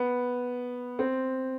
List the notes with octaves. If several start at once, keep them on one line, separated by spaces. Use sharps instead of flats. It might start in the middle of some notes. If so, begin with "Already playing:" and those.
Already playing: B3
C4